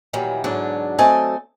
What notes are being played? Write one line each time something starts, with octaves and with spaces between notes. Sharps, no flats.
A#2 D#3 E3 F#3 G3
G#2 B2 D3 F#3 D4
F#3 A3 C4 D#5 G#5 A5